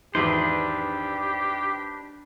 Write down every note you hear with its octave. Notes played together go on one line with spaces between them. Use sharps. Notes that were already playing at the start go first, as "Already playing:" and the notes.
G#1 E2 D4 D#4 G4 B4 C5